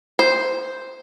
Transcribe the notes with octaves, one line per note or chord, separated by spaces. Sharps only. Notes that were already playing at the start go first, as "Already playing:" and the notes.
C5